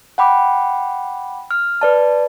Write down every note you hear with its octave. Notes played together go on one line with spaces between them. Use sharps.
F#5 G5 B5 D6
F6
B4 D5 A5